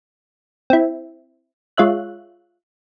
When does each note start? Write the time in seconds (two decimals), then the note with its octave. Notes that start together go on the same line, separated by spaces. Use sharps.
0.70 C4 E4
1.77 G#3 F4 C#5 E5 F#6